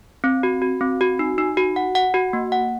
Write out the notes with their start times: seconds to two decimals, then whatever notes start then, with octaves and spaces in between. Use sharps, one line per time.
0.24 C4
0.43 F#4
0.62 F#4
0.81 C4
1.01 F#4
1.19 D#4
1.38 D#4
1.57 F#4
1.76 F#5
1.95 F#5
2.14 F#4
2.33 A#3
2.52 F#5